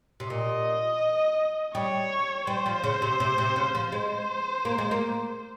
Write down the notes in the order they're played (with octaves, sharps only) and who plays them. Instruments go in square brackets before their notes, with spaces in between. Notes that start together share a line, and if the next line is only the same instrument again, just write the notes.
[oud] C3
[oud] A#2 [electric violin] D#5
[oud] G3 [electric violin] C#5
[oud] G3 [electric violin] C5
[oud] F3
C#3
C3
C3
C3
C#3
F3
[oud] G#3 [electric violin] C5
[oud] A#3
G#3
A#3